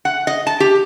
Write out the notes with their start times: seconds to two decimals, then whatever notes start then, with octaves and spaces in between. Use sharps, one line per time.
0.05 F#5
0.27 D#5
0.47 A5
0.60 G4